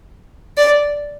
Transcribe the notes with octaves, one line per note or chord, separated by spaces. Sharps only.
D5